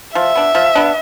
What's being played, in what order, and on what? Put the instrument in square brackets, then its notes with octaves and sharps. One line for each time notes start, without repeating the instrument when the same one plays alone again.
[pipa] F3 [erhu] E5
[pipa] B3 D4
F3
B3 D4